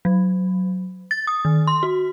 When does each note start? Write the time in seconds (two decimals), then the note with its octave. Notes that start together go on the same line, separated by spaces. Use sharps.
0.05 F#3
1.11 A6
1.27 D#6
1.45 D#3
1.67 C6
1.83 F#4